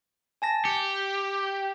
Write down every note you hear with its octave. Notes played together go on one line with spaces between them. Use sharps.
G#5 A5 A#6
G4 C#7